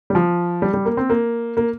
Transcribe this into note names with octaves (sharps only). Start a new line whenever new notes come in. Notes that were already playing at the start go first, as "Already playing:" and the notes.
G3
F3
G3
G3
A#3
C4
A#3
A#3